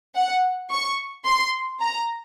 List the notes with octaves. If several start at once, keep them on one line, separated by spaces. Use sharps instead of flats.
F#5
C#6
C6
A#5